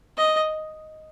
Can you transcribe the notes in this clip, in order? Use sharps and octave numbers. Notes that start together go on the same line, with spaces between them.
D#5